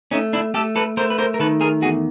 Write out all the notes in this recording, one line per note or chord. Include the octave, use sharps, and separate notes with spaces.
A3 C#4 D#4
D4 E4
A3 G4 A4
A4 B4
A3 A#4 C5
B4
A#4 C5
A#4
D#3 A4 B4
G#4 A#4
E2 F#4 G#4